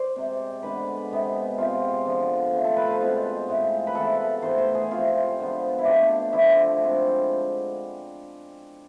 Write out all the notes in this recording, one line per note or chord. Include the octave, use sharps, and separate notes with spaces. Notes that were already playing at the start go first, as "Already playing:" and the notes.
Already playing: C5 D5
C3 G#3 C4
D3 G#3 B3 B4
C3 G#3 B3
C3 G#3 C4 F4
D3 F3 B3
D3 A3 C4
A4
B4
C5
B2 G#3 C4 F4
A2 G#3 C4
B4
C3 E3 B3 A4
A2 E3 B3 C5
C5
G#4
C3 F3 A3 C4 F4
D3 F3 G#3 B3
E4
B2 A3 C4 D4
D3 F3 A3 E4
D3 G#3 C4